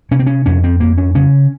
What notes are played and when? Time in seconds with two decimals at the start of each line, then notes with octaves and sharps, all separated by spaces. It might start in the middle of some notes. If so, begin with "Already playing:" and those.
0.11 C3 C#4
0.19 C4
0.26 C#4
0.46 F2 C#4
0.64 C4
0.80 F2 A#3
0.98 C#4
1.15 C#3 C#4